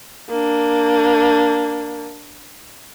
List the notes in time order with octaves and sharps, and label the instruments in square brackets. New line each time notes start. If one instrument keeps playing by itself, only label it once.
[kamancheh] A#3 D4